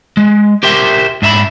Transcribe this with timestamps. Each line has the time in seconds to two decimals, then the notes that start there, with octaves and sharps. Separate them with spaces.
0.17 G#3
0.63 G4 A#4 C5 E5 G5
1.22 G#2 D4 E5 A#5 B5